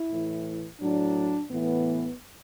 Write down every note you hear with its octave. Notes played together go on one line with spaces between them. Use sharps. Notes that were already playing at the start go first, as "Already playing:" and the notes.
Already playing: E4
A2 E3
A2 F#3 D4
A2 E3 B3